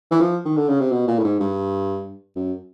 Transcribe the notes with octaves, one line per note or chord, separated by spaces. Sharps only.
E3
F3
D#3
D3
C#3
C3
B2
A#2
A2
G#2
G2
F#2